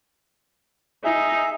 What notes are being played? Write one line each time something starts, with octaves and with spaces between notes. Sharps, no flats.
D#4 G#4 E5